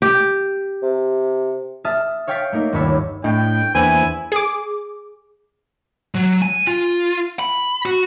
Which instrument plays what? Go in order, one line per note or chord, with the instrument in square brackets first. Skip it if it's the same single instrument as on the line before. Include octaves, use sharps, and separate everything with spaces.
[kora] G4
[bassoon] C3
[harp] E5 A5 D#6 F6 A6
C#5 F5 G5 C#6 A6 B6
A3 A#3 D#4 A#4
G1 D#2 C#5 A5 B5 E6
[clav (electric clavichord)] A2 [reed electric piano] D4 D#5 [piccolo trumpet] G5
[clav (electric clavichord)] E2 B4 [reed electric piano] A#3 D4 C5 [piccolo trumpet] E4 [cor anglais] G#5
[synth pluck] G#4 D6
[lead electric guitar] F#3
G#5
F4
B5
F#4